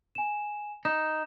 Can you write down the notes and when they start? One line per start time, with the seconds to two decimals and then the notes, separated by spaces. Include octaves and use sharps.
0.15 G#5 E7
0.85 D#4 E7